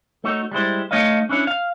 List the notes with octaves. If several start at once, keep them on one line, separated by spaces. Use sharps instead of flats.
A3 D#4 F#4 C#5
G3 G#3 E4 C5
A3 D#4 C#5 D#5 F5
C#4 D4 E4 C#5
F5